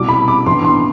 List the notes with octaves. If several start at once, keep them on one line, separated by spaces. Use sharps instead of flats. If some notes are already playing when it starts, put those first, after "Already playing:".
Already playing: C2 B2 G3 D6
B5
D6
A2 E3 B3 D4 C6
C6